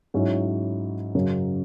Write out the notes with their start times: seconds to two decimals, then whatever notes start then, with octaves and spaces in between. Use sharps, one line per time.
0.14 G#2 F#3 C#4 E4
1.15 F#2 C#3 F#3